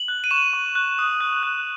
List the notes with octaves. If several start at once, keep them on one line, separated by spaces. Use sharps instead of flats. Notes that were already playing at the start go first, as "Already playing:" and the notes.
Already playing: F#7
F#6
D#7
C#6 E7
C#6
F#6
D#6
F#6
F#6